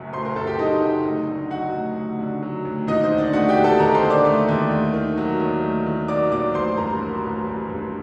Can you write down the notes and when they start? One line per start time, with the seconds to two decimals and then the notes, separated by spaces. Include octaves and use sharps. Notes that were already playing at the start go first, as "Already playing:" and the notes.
Already playing: F#1 F#2 F#3 A3
0.13 A3 C5 C6
0.25 A#4 A#5
0.35 F#2 A4 A5
0.47 G4 G5
0.58 F#3 D#4 D#5
0.82 F#1
1.05 D2
1.27 D3
1.50 F#3 F#4 F#5
1.73 D2
1.97 D2
2.19 D3
2.43 F#3
2.65 D2
2.88 D#2 D#4 D#5
3.04 C5
3.11 D3
3.18 D4 D5
3.33 A3 F#4 F#5
3.48 G4 G5
3.56 D#2
3.64 A4 A5
3.79 D#2 A#4 A#5
3.95 C5 C6
4.03 D3
4.10 D5 D6
4.25 A3
4.49 D#2
4.71 A3
4.94 D#3
5.18 F#3
5.40 D#2
5.64 A3
5.86 D#3
6.08 F#3 D5 D6
6.32 D#2 D5 D6
6.54 A1 C5 C6
6.77 G2 A#4 A#5
7.00 F#3
7.24 A1
7.47 A1
7.69 G2